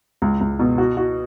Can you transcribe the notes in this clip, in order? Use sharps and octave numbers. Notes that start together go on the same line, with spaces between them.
C#2
C#2
B2
F#4
F#4